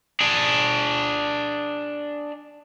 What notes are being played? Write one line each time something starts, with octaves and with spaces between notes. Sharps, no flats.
D4 G#4